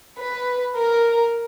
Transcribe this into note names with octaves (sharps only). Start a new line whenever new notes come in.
B4
A#4